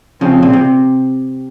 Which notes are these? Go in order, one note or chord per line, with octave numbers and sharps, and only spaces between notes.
C#3 F3 C4
A#2
C3